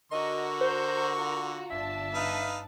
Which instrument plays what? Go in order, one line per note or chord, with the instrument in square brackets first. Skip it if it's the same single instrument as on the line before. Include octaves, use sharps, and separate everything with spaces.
[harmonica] D3 C#6 [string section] F#4 A#5 [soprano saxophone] A#4 [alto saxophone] D#5
[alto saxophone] C5
F4
[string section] G1 D4 A5 [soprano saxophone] E5
[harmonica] D#4 B4 F5